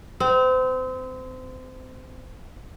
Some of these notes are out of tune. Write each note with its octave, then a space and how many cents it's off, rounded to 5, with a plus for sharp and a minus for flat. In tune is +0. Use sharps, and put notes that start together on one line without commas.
C4 -30